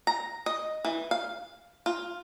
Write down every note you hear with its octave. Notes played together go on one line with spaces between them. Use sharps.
A#5
D#5
E3
F5
F4